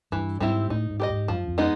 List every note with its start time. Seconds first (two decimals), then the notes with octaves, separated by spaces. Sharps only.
0.12 G2 E3
0.40 G#2 G3 C4 E4 G4
0.70 A2 D#4
0.90 G#2
1.00 G4 B4 D#5
1.10 G#2
1.28 F#2 F3
1.48 F2
1.58 G#3 B3 D#4